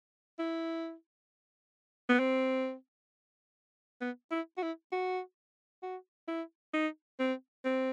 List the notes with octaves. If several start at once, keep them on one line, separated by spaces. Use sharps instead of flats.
E4
B3
C4
B3
E4
F#4
E4
F#4
F#4
E4
D#4
C4
C4